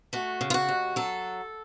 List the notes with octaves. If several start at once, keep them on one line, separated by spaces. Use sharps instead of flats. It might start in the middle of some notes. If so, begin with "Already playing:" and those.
A3 F#4
C#3
F4
F#4
D#2
F#3 A4